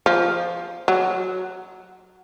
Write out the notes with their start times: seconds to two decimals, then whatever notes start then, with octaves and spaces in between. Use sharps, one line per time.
0.06 F3
0.88 F#3